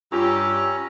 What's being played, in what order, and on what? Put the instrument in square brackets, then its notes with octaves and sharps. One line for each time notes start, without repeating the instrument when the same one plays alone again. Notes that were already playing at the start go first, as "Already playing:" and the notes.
[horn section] G2 G4 [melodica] C#4 A#5 [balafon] F4 [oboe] E6